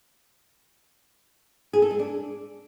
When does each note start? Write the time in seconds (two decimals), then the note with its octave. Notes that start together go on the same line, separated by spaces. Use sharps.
1.73 G#4
1.82 A4
1.91 G#3
1.99 D4